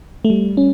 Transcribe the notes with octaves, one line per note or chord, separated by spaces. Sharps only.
A3
G3
C#4